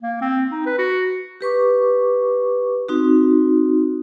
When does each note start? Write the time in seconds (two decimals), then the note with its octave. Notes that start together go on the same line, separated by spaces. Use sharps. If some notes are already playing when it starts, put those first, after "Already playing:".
0.02 A#3
0.21 C4
0.51 D#4
0.66 B4
0.79 F#4
1.41 G4 B4 C#6 D6
2.89 C4 D#4 F#4